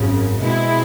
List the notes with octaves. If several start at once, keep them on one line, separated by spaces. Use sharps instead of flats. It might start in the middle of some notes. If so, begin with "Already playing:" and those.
Already playing: G#1 F#2 C#3
B2 G#3 C4 E4